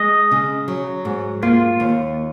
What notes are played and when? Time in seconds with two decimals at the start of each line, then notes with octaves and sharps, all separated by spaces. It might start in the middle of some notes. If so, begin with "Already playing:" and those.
Already playing: G#3 D#5
0.31 C#3
0.68 F#3
1.05 G#2
1.42 A#3 F4
1.80 D#2